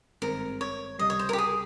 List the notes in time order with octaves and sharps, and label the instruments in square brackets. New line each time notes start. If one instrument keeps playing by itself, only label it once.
[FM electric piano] G#1 G2 D#3 G#3 C4 [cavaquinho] A#4
[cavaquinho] C#5
[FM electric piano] C#2 C3 G3 [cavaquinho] D#5
[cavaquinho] C#5
C5
A#4
G4
G#4